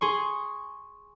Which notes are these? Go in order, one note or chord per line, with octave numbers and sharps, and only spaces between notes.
G#4 C6 C#6